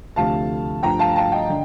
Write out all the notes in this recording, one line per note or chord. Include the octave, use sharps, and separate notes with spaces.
D2 C3 F3 A3 F5 A5
G2 F3 A3 G5 A#5
F5 A5
F5 A5
D#5 G5
D3